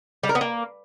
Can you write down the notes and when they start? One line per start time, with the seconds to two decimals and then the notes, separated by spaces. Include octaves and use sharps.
0.23 G3
0.29 A#4
0.35 B3
0.41 A#3